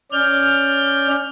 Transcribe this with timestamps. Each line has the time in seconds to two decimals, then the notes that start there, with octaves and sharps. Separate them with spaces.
0.12 C#4 D5 F6 G6